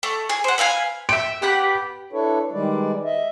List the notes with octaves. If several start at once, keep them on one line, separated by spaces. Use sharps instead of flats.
A3
G#4
C5 F#5
B4 E5 F5 G#5
E5 G5 D7
B3 G4 F#5 B5
D4 E4 A4 B4 C#5
D#3 G3 G#3 B4 D5
D#5 E5